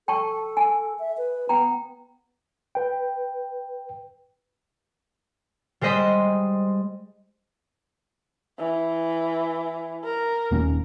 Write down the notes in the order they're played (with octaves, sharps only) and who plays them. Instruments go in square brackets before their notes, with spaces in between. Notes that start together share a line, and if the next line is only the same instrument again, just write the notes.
[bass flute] A4 [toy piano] G5 A5 C#6
[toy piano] G#5
[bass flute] E5
B4
[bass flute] B3 [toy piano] G5 A#5
[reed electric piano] B4 G5
[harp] G3 G#3 C5 D#5 B6
[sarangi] E3
A#4
[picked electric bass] D#1 A#3 C#4